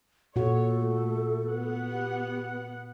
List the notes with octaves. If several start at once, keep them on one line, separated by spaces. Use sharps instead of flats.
A#2 F#4 A4 C#5
A3
B3 F#5
G4